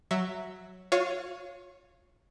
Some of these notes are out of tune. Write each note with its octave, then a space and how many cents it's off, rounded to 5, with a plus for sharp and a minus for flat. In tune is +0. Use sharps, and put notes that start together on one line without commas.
F#3 +0 E5 +0
F4 +45 C#5 +0 F5 -20